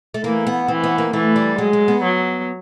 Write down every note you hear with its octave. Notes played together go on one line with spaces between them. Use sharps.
A3
E3 A#3
B3
E3 C4
B3
A#3
E3 A3
G3
F#3 G#3
F#3
B3
F#3